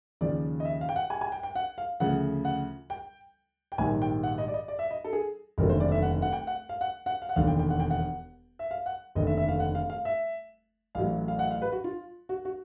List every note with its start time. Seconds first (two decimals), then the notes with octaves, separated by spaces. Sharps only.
0.21 D#2 C#3 F3 D5
0.60 D#5
0.65 E5
0.81 F5
0.89 G5
0.96 F#5
1.10 G#5
1.21 G#5
1.32 G5
1.43 G5
1.55 F#5
1.78 F5
2.00 D2 C#3 F3 F#5
2.45 F#5
2.90 G5
3.72 G5
3.78 A#1 G#2 D#3 G3 G#5
4.02 G5
4.23 F#5
4.38 D#5
4.48 D5
4.54 D#5
4.68 D5
4.79 E5
4.91 D#5
5.04 A4
5.13 G#4
5.58 F1 D#2 D3 F#3 A#4
5.69 C5
5.80 D5
5.92 E5
6.02 F#5
6.22 F#5
6.33 G5
6.47 F#5
6.69 F5
6.81 F#5
7.06 F#5
7.22 F5
7.29 F#5
7.36 E1 D#2 D3 F5
7.47 G5
7.59 G5
7.70 F#5
7.80 G5
7.91 F#5
8.59 E5
8.71 F5
8.86 F#5
9.15 F1 D#2 D3 D#5
9.27 E5
9.38 E5
9.49 F5
9.60 F#5
9.75 F5
9.90 F5
10.05 E5
10.95 A1 A2 F#3 F5
11.28 F5
11.39 F#5
11.51 F5
11.62 B4
11.72 F#4
11.84 F4
12.29 F#4
12.45 F#4